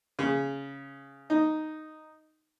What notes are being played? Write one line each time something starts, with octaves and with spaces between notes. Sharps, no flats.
C#3
D#4